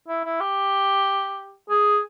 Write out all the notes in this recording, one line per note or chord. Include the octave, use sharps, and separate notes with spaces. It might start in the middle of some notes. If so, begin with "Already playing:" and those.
E4
E4
G4
G#4